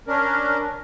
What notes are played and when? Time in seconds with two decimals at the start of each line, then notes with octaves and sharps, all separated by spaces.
0.07 C#4 D4 A#4